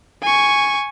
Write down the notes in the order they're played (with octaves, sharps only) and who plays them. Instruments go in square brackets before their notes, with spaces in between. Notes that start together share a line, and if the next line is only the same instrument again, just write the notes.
[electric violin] G#5 C#6